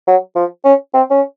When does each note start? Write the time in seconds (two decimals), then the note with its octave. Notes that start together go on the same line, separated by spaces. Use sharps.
0.07 F#3
0.36 F3
0.65 C#4
0.94 C4
1.10 C#4